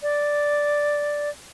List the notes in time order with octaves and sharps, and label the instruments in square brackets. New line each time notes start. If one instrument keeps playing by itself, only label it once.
[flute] D5